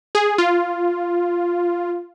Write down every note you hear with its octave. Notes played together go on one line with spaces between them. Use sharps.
G#4
F4